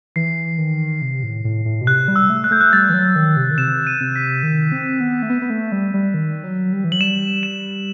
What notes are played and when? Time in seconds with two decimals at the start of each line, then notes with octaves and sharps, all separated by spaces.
0.16 E3 C7
0.58 D#3
1.02 C3
1.23 A2
1.44 A2
1.65 A2
1.81 B2
1.87 C3 F#6
2.08 G3
2.16 E6
2.30 A3
2.44 F#6
2.51 A3 G6
2.61 F#6
2.73 G3 A6
2.90 E3
2.94 F#3
3.16 D#3
3.37 C3
3.51 D#3
3.58 C3 E7
3.87 D#7
4.00 C3
4.16 B6
4.43 D#3
4.72 C4
5.00 B3
5.22 A3
5.30 B3
5.42 B3
5.50 A3
5.72 G3
5.94 G3
6.14 D#3
6.44 F#3
6.72 G3
6.84 E3
6.92 F#3 F#7
7.00 G3 E7
7.43 E7